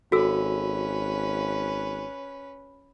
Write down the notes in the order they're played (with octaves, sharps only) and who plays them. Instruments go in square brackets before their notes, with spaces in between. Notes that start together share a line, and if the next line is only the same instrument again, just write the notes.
[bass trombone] G#1 [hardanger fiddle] C#4 B4 [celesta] F#4 A4 E6